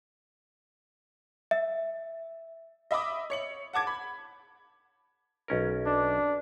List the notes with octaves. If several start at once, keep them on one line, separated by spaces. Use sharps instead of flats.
E5
D#5 E5 B5 D6 D#6
C#5 C#7 F#7
F#5 A5 D6 G#6
B5
B1 C#4 A#4
D4